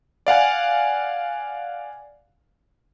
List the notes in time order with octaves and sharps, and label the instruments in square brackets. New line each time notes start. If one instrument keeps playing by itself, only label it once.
[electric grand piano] D5 F5 F#5 G#5